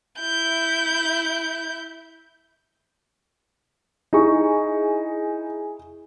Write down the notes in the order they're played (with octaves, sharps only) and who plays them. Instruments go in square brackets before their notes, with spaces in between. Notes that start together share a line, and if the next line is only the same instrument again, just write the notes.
[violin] E4 G6
[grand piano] D#4 [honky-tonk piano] E4 G#4 C#6